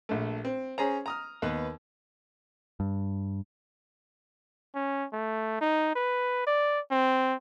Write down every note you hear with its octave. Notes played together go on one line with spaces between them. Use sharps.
A#1 A3
C4
C#4 G#4 C5 A#5
A#5 D#6 F6
D#2 B3 B4
G2
C#4
A3
D#4
B4
D5
C4